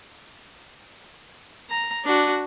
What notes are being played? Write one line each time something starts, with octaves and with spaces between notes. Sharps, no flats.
A#5
D4 F#4